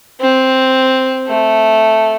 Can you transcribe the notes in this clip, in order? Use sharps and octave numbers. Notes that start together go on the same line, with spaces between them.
C4
A3